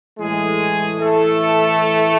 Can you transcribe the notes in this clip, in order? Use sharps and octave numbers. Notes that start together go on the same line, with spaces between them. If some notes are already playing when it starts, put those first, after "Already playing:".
A2 E3 G#3 A3 G#4
A3 A4